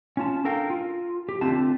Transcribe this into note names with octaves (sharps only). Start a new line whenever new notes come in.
C#4 F4 A5
D4 A4 A#4 F5 G5
F4
G4
D3 A3 C4 F4 A5